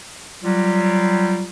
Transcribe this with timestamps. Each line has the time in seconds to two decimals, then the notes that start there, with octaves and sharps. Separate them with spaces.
0.43 F#3 G3 F4